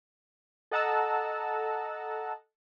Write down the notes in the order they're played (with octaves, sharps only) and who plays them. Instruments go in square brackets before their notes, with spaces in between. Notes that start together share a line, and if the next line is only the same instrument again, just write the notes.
[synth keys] A4 D#5 F#5 A5 A#5 E6